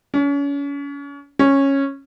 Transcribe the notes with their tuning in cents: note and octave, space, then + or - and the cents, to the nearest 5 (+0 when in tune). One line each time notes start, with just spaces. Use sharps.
C#4 +35
C#4 -10